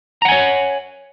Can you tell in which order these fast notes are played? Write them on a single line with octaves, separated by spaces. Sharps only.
A#5 F#5 G#5 C#5